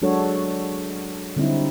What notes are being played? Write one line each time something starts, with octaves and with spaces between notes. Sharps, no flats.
F#3 G#3 D4 F#4 A4 C#5
D3 G3 C4 D#4 E4